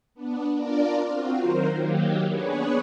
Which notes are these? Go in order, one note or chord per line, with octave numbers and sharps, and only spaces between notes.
B3 D4
D4 F4 A#4 D5
C4 F4 F#4
D#3 F#3 A#4 C5
D#3 F#3 A#3 G4
B3 D4 G#4 B4 C#5